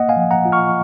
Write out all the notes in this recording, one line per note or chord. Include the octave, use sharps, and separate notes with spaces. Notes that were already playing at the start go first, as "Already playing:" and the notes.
Already playing: A#3 D#5 F#5
F5 G#5
F3
F#5 A#5
F4
C#6 F6